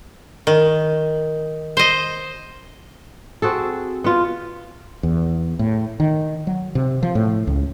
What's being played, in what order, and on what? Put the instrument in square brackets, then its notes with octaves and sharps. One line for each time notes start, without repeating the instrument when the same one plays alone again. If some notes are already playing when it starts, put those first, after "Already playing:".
[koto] D#3
C5 D#5
[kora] C4 F#4 G#4 A4
B3 F4
[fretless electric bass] E2
A2
D#3
F#3
C3
F3
A2
C#2